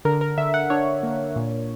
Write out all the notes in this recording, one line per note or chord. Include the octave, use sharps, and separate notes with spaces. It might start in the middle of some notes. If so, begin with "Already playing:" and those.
D3 A#4
A#4
D3 E5
F#5
D4 C#5
A#3
A#2